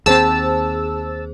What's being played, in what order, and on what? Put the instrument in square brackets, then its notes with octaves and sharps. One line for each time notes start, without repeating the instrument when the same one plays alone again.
[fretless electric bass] D#2 G#3 C4 [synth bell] G#4 C5 [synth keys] A5 E6